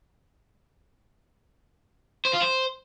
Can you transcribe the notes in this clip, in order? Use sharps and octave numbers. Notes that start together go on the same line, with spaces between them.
C5
F4
C5